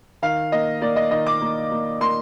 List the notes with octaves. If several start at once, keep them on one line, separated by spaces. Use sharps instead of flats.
D#3 F5
A#3 D#5
A#3 D5
D#5
D#3 D#5
D6
A#3
A#3
A#3 C6